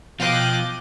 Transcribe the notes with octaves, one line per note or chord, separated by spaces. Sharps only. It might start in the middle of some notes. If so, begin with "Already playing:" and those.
B2 F3 D#5 F5 G5 D6 F#6